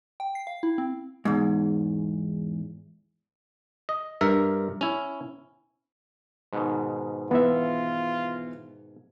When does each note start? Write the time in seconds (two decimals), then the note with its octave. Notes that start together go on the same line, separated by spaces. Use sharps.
0.20 G5
0.35 C7
0.47 F5
0.63 E4
0.78 C4
1.25 E2 G#2
3.89 D#5
4.21 G2 A#4 E5
4.81 C#4 E4
6.53 G#2 B2 D#3
7.31 E3 B3 F4 E5